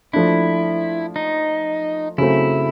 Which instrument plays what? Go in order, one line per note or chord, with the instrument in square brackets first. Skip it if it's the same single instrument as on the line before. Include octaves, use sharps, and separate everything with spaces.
[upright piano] F3 A3 D4 [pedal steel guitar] E4
[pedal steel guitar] D#4
[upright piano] C#3 F#3 A3 C4 [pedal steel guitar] E4